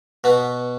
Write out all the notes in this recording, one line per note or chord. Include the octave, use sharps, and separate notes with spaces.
B2 B3